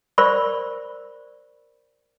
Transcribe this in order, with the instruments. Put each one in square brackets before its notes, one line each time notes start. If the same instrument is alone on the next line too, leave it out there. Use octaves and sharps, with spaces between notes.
[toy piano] A#4 C5 D5 B5 C#6